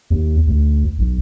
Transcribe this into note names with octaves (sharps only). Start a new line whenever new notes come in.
D#2
D2
B1